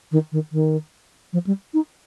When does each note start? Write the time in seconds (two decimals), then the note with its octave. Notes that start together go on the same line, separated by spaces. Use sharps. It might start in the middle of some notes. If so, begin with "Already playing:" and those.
0.12 D#3
0.32 D#3
0.52 D#3
1.33 F3
1.47 G3
1.74 D#4